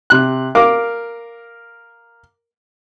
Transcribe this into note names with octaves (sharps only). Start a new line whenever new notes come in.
C3 F#6
A#4 F5 D6